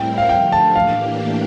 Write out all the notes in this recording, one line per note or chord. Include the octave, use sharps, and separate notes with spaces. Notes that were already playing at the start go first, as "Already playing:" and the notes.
Already playing: A2 G3 C4 E4 A#4 G5
F5
D3 F3 A3 G5
A5
A2 E3 A#3 D4 G4 F5